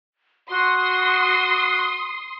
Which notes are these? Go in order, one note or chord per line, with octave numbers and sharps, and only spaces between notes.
F#4 C6 D#6